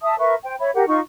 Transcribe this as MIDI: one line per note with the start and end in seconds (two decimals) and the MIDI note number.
0.02 0.16 76
0.02 0.16 81
0.02 0.16 87
0.18 0.34 70
0.18 0.34 71
0.18 0.34 76
0.18 0.34 85
0.44 0.54 72
0.44 0.54 79
0.59 0.70 73
0.59 0.70 76
0.59 0.70 83
0.74 0.84 67
0.74 0.84 70
0.74 0.84 78
0.87 0.99 63
0.87 0.99 65
0.87 0.99 85